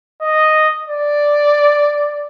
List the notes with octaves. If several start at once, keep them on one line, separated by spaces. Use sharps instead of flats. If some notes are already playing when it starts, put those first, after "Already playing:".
D#5
D5